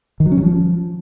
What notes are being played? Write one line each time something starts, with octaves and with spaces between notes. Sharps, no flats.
D#3
F#3
C#4
F#3
F3